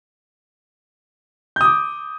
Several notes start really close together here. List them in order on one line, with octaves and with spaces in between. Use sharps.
G6 D#6 D6